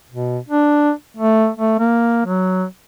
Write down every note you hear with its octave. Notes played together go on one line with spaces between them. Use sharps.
B2
D4
A3
A3
A#3
F#3